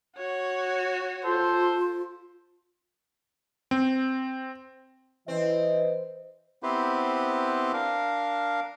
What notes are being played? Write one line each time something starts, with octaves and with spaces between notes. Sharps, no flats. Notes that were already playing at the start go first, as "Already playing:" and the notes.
F#4 C#5
F4 A4 C5
C4
E3 C4 B4 D#5
B3 C4 E4 G4 B4 C5
D4 A#4 F5